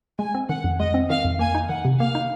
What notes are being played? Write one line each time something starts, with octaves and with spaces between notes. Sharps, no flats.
G#3 G#5
C4
D#3 F#5
F2
G#3 D#5
C4
D#3 F5
F2
A#3 G#5
D#4
D#3 F#5
C3
A#3 F5
D#4